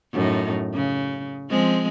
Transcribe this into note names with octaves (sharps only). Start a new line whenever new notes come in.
F#2 A2 D#4
C#3
F3 G#3 C4